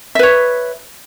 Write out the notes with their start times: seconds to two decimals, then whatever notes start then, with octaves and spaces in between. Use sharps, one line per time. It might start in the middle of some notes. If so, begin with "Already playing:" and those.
0.15 E5
0.19 B4
0.23 C#5